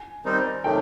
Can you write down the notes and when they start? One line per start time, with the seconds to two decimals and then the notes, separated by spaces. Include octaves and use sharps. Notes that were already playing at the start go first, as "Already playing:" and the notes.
Already playing: G#5
0.25 D#3 G3 C4 D#4
0.64 C3 D#3 F#3 A3 G5